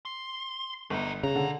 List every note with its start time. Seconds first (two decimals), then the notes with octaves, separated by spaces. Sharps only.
0.05 C6
0.90 G1 G2 D#4
1.23 C#3 C#4 A#5
1.36 D3